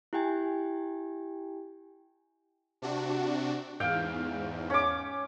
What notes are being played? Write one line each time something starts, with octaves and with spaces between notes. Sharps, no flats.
E4 G4 G5 G#5
C3 D4 F#4
E2 G#2 F5 G5
C#4 D6